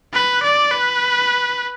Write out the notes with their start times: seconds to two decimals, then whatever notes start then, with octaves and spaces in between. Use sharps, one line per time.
0.13 B4
0.43 D5
0.72 B4